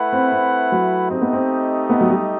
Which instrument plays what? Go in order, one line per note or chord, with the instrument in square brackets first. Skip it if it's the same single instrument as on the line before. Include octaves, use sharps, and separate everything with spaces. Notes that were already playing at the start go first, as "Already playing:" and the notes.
Already playing: [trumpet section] A3 E4 B4 F#5
[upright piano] C4
C4
F#3
[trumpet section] A3 D#4 G4 D#5 [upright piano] C4
[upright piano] B3
C4
B3
F#3
G3